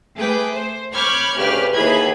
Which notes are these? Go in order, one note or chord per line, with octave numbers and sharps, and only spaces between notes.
A3 G#4 B4 G5 D6
C5
C#5 B5 D6 F6 G6 G#6
D2 C#3 G4 B4 F6
D#2 E3 G#4 B5 G#6